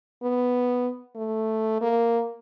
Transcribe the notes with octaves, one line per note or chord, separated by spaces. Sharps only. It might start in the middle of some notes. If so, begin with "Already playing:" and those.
B3
A3
A#3